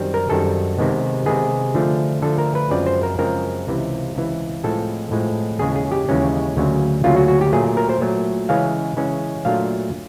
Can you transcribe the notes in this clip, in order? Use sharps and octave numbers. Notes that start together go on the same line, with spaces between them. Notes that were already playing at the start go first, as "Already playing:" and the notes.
Already playing: F#2 D#3 G3 C4
A#4
F#2 D#3 G3 C4 A4
C3 D#3 G#3 B3
C3 D#3 G#3 B3 G#4
D3 F3 A3
D3 F3 A3 A4
A#4
B4
F#2 C#3 F3 G#3 C4 D5
C5
A#4
F#2 C#3 F3 G#3 C4 A#4
C#2 C3 E3
C#2 C3 E3
A2 F3 G#3 C4 A4
A2 F3 G#3 C4
D#2 C#3 E3 G#3 C#4 G#4
G#4
G4
D#2 C#3 E3 G#3 C#4
D2 C#3 F#3 A#3 C#4
D2 C#3 F#3 A#3 C#4 F4
F#4
F#4
G4
A#2 F#3 A3 G#4
A#4
C5
A#2 F#3 A3
C#3 E3 G#3 C#4 F5
C#3 E3 G#3 C#4
A#2 F#3 A3 D4 F4 F5